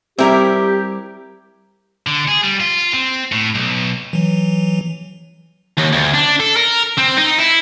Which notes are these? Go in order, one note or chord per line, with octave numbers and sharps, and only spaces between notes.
G3 C4 E4 G4 A#4 E5
D3
G#4
G3
F4
C4
A2
B1
E3 F#3
D#2
D2
D4
A4
A#4
C4
D#4
E4